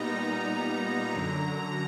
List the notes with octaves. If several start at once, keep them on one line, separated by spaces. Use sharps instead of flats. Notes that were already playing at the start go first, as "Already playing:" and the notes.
Already playing: A#2 G3 B3 D#4 A#5
F#2 D3 F#3